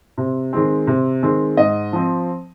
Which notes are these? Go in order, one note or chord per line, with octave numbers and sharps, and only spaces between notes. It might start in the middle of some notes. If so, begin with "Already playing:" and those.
C3
D#3 G#3 C4
C3
D#3 G#3 C4
G#2 D#5
F3 C4